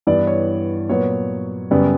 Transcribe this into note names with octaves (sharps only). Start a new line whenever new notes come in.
G2 E3 B3 D5
C#5
A#2 F#3 B3 C#5
F#2 C#3 G3 B3 D5